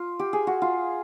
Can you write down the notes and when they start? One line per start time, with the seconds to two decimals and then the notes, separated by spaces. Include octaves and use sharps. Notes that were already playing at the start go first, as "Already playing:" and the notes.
Already playing: F4
0.19 G4
0.33 G#4
0.47 F#4
0.62 F4